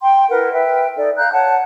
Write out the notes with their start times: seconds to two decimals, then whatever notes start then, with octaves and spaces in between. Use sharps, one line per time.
0.01 G5 C6
0.29 E4 A#4 B4 F#5
0.52 B4 E5 G5
0.96 D#4 A4 D5
1.16 F5 A#5 F#6 G6
1.31 C#5 F#5 A5